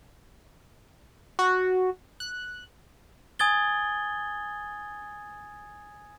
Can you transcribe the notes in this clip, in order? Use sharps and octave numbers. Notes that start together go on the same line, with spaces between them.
F#4
F#6
G#5 D#6 G#6 A6 G7